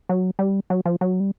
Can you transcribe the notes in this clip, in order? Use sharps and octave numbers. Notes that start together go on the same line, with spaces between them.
F#3
G3
F#3
F3
F#3
G3